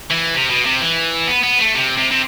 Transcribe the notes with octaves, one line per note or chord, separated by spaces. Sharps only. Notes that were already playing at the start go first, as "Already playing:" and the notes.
E3
C3
B2
C3
E3
B3
B3
A3
C3
C3
C3